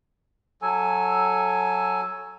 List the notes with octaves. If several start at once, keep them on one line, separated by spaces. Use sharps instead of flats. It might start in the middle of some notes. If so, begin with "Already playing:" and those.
F#3 A4 G#5